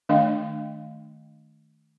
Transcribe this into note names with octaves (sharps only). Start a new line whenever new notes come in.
D#3 A3 D4 D#5 F5 G5